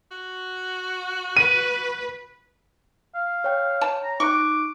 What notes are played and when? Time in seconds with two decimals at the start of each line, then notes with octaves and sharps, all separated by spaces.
0.12 F#4
1.37 B4 D#7
3.15 F5
3.44 C#5 G5
3.81 A5
4.04 A#5
4.20 D#4 C#6 D6 F#6